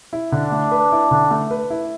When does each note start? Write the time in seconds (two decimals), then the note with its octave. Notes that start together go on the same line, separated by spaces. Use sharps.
0.13 E4
0.32 D3 D4
0.52 A3
0.72 B4
0.92 E4
1.11 D3
1.31 A3
1.51 B4
1.70 E4